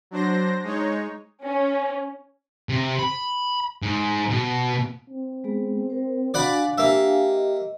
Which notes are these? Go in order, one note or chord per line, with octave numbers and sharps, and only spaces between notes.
F#3 D4 C5 A#6
G#3 D#4 C#5
C#4
C3
B5
G#2
B2
C4
G#3 B3 G#4
A#4 C5
D4 F#4 D5 F5 F#5 G#5 B5
A#3 G4 E5
D#5